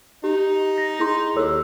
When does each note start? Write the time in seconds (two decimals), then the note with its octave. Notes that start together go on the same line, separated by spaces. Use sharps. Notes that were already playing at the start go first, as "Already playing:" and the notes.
0.24 D#4 G4
0.78 A#6
0.99 E4 G#4 C6
1.36 D#2 A4 C#5 E6